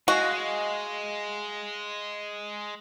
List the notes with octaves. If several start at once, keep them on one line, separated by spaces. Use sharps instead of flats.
G#3 F#4 D#5 F5 G#5